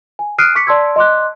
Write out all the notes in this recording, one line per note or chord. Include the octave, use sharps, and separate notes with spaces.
G#5
D#6 F6 F#6 C7 D7 D#7
C#6 D6 B6 C#7
D5 A5 C6 E6 G#6
D#5 C6 D6 F#6